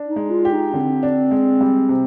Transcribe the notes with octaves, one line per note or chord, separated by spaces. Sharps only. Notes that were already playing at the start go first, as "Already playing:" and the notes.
Already playing: D4
D#4
G#3
F4
G4
D#4
D3 C4
D4
G#3
G3
C3